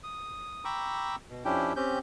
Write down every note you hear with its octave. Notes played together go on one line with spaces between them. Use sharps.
D#6
G5 A#5 B5 C#6 D6 E6
B2
F2 C#4 D4 E4 G4 G5
C4 C#4 G4 G6